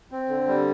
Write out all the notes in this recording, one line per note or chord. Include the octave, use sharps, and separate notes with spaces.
C4
D3
G3